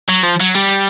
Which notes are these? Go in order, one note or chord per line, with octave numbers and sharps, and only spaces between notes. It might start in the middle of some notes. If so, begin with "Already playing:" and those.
F#3
F3
F#3
G3